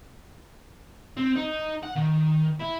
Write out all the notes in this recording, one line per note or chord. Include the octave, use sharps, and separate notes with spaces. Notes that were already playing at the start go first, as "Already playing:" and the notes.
C4
D#4
F#5
D#3
E4